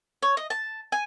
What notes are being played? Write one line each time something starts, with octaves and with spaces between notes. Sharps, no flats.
C#5
D#5
A5
G#5